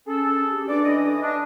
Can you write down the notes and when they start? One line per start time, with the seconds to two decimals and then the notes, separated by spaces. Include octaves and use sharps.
0.07 C#4 G#4 A4
0.51 G4
0.68 A3 D4 B4 D5
0.84 E3 D5 D#5
1.22 D4